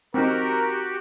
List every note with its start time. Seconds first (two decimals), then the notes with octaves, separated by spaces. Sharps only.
0.14 C4 D#4 F#4 G4 A#4